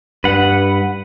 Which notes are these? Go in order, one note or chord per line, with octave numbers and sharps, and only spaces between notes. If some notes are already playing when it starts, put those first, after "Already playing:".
G2 B4 F#5